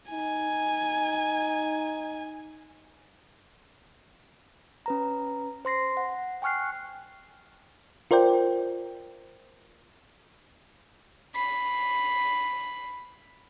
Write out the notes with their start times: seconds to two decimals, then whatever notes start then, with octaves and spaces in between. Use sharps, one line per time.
0.11 D#4 G#5
4.86 C#4 B4 A#5
5.65 C5 C6 A#6 C7
5.97 F#5
6.42 G5 G#5 C#6 F6 F#6 C7
8.11 F4 A#4 C5 D5 G5
11.34 B5 C7